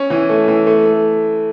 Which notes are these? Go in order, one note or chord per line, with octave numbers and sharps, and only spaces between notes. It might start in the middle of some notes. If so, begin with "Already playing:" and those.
Already playing: C#4
E3
A3
E3
A3
A3